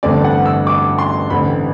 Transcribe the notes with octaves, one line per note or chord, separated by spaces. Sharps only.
A1 G2 D3 A3 C4 D5
F#5
E6
D6
C6
A1 G2 D3 A3 C4 B5